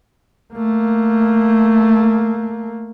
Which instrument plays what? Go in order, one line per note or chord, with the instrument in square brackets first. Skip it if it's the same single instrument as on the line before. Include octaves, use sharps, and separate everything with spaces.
[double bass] A3 A#3